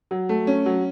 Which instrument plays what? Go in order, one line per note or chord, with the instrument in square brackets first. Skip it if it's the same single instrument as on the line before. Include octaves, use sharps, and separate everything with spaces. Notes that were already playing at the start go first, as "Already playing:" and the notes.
[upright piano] F#3
A3
C#4
F#3